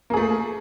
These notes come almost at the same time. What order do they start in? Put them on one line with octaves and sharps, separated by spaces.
A#3 G#4 A3